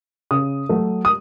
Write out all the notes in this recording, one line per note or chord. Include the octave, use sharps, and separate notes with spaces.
C#3 D#6
F#3 A3
D#6